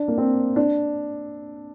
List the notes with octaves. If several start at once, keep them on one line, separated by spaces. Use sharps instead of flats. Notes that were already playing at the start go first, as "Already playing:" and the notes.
Already playing: D4
A#3
C4
D4